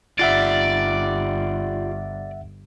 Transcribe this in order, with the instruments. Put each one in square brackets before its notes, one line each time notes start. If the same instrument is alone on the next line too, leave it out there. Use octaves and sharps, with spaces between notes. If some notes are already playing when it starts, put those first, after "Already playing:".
[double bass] G1 [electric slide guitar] F4 G4 [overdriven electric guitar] D5 [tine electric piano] E5 F#5 A6